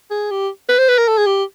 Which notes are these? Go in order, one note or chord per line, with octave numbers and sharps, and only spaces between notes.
G#4
G4
B4
C5
B4
A#4
A4
G#4
G4